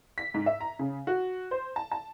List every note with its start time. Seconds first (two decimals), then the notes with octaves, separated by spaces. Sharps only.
0.18 B6
0.34 G#2
0.46 E5
0.60 A#5
0.79 C#3
1.07 F#4
1.51 C5
1.76 A5
1.92 A5